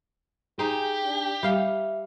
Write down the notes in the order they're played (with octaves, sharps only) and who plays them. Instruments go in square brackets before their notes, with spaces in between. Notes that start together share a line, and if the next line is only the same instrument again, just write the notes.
[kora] D#4 C5 [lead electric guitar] G4 [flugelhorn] G#4
[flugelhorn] D4
[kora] G3 F5 [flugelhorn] E5